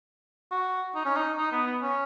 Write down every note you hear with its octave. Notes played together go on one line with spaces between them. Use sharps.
F#4
D#4
C#4
D#4
D#4
B3
B3
C#4